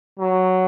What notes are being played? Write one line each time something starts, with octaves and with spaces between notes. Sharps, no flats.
F#3